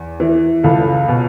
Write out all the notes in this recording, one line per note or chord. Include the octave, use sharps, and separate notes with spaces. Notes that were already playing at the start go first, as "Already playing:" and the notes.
Already playing: E2
E3
C#2 A4
B2